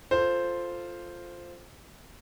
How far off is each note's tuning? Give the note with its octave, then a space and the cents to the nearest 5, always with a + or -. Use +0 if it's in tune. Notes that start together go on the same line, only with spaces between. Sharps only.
F4 +0 A4 +10 C5 +0